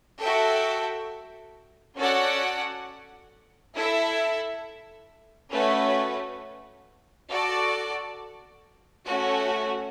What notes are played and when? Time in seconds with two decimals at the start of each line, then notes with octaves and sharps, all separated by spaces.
0.20 F#4 A4 E5 G5
1.97 C#4 F#4 A4 D5 F#5
3.75 E4 A4 E5
5.52 A3 C#4 F#4 B4
7.29 F#4 A4 D5 A5
9.07 A3 C#4 F#4